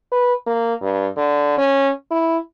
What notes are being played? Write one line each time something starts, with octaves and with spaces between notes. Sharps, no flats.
B4
A#3
G2
D3
C#4
E4